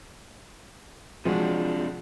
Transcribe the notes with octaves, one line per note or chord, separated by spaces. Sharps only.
C3 F3 G#3 D4 F#4